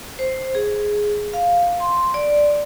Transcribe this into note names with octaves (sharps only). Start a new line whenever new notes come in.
C5
G#4
F5
C6
D5